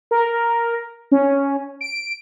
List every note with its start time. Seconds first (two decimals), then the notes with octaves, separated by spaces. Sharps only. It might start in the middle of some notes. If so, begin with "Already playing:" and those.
0.11 A#4
1.12 C#4
1.81 D7